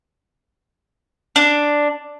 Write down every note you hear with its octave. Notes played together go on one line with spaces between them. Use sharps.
D4